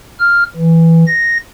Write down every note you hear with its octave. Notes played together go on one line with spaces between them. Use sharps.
F6
E3
A#6